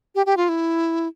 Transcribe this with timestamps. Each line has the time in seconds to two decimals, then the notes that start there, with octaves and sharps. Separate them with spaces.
0.15 G4
0.26 G4
0.37 F4
0.49 E4